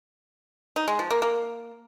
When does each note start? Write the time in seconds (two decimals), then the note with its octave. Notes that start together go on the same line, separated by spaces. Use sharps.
0.76 D#4
0.88 G#3
0.99 F3
1.10 A#3
1.22 A#3